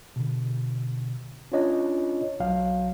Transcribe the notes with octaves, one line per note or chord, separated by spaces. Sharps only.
B2 D3
C#4 D4 F4 C#5 D#5
B1 F#3 F5